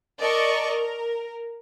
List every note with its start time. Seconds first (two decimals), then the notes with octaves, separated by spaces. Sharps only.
0.18 A#4 D5 D#5 A5 C#6
0.67 A#4